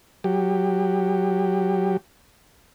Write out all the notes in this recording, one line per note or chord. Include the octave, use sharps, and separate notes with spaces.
F#3 G4